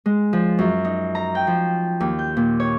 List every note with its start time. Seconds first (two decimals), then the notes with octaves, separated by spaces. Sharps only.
0.06 G#3
0.33 F3
0.59 F#2
0.85 D#4
1.15 A#5
1.35 G5
1.47 F3
2.00 D#2
2.19 G6
2.37 A#2
2.60 C#5